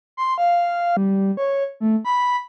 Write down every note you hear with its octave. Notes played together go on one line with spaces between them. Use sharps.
C6
F5
G3
C#5
A3
B5